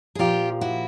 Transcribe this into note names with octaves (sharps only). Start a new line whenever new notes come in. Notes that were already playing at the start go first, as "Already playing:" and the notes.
G#4
A#2 F3 F4 G4
E4 F#4